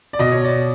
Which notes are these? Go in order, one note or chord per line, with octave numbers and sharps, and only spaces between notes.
D5
B2 D#5
C#5
D5